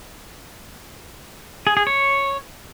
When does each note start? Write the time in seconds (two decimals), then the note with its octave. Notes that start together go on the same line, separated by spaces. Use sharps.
1.67 G#4
1.77 G#4
1.87 C#5